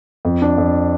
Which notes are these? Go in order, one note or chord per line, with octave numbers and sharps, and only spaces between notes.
F2
D4
F2